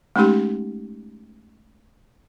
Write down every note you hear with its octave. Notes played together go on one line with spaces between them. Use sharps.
G#3 A3 C#4 D#4 G4 C6